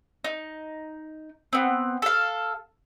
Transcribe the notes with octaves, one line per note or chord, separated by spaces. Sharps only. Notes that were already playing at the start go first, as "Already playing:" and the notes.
D#4
B3 C4
A4 F5